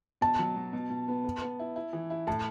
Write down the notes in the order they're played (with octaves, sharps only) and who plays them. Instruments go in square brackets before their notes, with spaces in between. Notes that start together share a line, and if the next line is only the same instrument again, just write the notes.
[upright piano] B2 [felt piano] A5
[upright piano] F#3
B2
B2
B2
B3
B3
B3
E4
E4
E3
E4
[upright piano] A2 [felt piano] A5